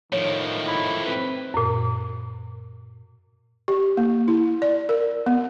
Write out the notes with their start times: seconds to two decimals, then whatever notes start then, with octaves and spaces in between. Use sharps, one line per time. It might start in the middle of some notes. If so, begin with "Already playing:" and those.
0.13 A2 D#3 F3 C#5
0.67 E4
1.06 C4 B4
1.54 F#2 A#2
3.68 G4
3.97 A#3
4.28 E4
4.62 D5
4.89 A#4
5.26 B3